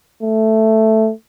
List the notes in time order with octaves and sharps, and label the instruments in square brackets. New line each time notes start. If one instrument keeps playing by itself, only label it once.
[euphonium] A3